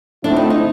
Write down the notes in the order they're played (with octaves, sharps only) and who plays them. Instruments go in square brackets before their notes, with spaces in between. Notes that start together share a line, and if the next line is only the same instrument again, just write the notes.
[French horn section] D3 F3 A3 C4 E4 [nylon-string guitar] D4
[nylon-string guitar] D#4
D#4